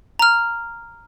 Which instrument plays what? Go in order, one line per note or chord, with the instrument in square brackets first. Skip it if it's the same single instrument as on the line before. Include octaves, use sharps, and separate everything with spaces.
[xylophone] A#5 F6